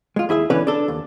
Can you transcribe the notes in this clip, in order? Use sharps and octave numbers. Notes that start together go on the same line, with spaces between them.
G#3 F4
D#2 E4 G#4 E5
B1 D3 E3 C#4 B4
D4 A4
D#2